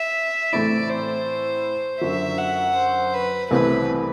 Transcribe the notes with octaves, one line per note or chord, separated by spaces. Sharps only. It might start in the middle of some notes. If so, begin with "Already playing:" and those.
Already playing: E5
A2 E3 A3 C4 E4 D5
C5
F#2 D3 F#3 E5
F#5
C5
B4
C2 C3 E3 A3 C4 B4